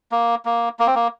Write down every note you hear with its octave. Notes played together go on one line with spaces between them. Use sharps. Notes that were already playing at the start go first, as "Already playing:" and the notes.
A#3
A#3
A#3
C4
A#3